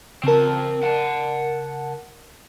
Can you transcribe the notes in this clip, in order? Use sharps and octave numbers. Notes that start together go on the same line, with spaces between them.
C#3 C4 A#4 A5
F#5 A5